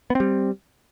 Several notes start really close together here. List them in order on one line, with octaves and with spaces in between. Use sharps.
B3 C4 G3